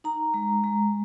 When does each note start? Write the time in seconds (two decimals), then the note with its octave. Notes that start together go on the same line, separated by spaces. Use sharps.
0.04 D#4 A#5
0.34 G#3
0.64 G#3